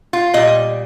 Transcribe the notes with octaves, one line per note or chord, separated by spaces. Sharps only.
F4
A#2 G3 D#5